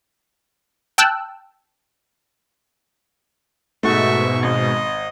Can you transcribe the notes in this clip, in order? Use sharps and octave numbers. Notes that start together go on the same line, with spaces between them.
G5 A5 E6 F#6
G#2 B2 A3 F#4 E5 C#6
G#1 D#5